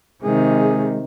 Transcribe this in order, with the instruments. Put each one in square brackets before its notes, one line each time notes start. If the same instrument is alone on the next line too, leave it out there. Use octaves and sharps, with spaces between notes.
[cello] C3 D#3 [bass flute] G#3 [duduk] G#4